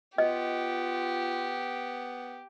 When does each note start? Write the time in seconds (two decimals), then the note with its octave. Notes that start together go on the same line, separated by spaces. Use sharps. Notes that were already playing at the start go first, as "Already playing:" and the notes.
0.18 B3 F4 G4 D#5